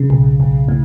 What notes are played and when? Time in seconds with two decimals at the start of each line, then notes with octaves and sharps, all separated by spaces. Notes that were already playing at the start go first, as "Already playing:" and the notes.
Already playing: C#3
0.10 B1
0.40 B1
0.68 A2